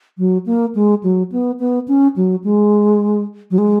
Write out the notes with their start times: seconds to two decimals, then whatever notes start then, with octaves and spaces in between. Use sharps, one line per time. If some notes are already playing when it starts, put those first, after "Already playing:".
0.18 F#3
0.46 A#3
0.75 G#3
1.03 F#3
1.32 B3
1.60 B3
1.88 C#4
2.16 F#3
2.44 G#3
3.51 F#3
3.58 G#3